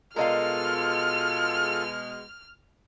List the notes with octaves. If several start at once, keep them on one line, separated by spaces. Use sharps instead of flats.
B2 G#3 F4 A4 A#4 D#5 F5 F6